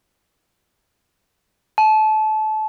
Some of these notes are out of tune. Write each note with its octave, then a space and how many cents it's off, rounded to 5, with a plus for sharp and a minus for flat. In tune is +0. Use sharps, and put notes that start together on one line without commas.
A5 -25